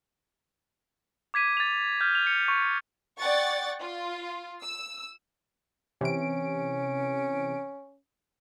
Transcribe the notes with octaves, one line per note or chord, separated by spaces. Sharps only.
D6 G#6 B6 D#7
A6 F7
F6 G6
F7
C#7
C#6
D5 F#5 G5 C#6 A6
F4
E6
C3 E3 C#4 D7